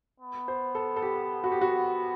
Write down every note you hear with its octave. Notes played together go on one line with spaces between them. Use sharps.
B3
C5
A4
A4
G4
F#4
G4
F#4